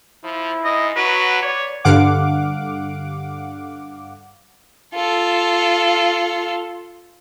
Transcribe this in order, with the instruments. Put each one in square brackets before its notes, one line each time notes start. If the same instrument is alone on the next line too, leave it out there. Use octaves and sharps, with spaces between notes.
[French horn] F3 [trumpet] E4
[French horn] G#2 [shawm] D#5
[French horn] F#3 [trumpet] F#4 [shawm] B4
[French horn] C#5 [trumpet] D5
[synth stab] G2 D3 F5 F#5 D6
[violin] F4 A4